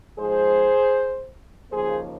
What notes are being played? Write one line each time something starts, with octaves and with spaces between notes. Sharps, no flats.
G#2 F3 G#3 G#4 C5
D#2 C#3 F3 A#3 G#4 C5